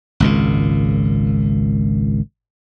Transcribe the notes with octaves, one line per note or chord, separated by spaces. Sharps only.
G#1 C#2 A#2